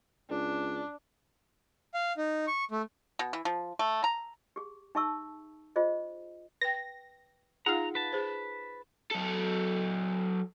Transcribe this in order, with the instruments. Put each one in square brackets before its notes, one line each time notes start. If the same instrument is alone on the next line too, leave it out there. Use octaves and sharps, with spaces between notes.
[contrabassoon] C#2 [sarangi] D4
[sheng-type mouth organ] F5
D#4
C#6
A3
[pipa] B2
E3
F3
A3
A#5
[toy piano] G4 G#4
D#4 G#4 E5 A5 C#6 E6
F4 G#4 C5 D#5
[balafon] B4 G5 [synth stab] A#6
[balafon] D#4 F4 G#4 [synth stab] F5 F#5 [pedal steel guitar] A#5
[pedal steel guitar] B4 A5
[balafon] G#4 C5
[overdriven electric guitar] F#3 A4